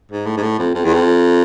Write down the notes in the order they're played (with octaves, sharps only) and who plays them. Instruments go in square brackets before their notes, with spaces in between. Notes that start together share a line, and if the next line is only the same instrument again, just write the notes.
[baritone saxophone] G#2
A2
G#2
A2
F2
F2
E2
F2